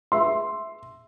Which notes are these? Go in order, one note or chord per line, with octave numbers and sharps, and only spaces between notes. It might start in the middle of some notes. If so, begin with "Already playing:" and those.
E5 C6